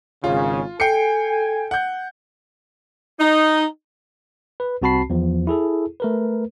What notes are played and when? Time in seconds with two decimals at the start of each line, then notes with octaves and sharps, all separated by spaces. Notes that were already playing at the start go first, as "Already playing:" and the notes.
0.24 G#1 C#3 F4
0.80 A4 G5 G#5 C7 C#7
1.71 F#5 G6
3.20 D#4
4.60 B4
4.82 C2 C4 F#4 A5 B5 C7
5.10 E2 F3
5.47 E4 G#4 A4
6.00 A3 A#4 B4